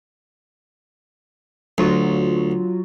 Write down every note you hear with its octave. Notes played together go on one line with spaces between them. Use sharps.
D2 F#3 F4 F#4